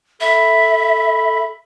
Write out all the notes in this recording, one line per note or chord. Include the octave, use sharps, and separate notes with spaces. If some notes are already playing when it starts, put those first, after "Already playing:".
A4 E5 B5